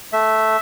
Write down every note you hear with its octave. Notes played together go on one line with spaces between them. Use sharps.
A3 E5